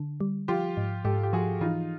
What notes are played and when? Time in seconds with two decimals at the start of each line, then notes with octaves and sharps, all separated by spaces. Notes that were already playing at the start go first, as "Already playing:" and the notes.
Already playing: D3
0.21 G3
0.48 F3 F4 G4
0.77 G#2
1.04 G#2 G4 A4
1.23 G4
1.33 F3 F#4 G#4
1.61 E3 D#4 F4